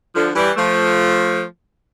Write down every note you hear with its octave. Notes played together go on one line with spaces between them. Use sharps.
D3 F3
E3 G3
F3 A3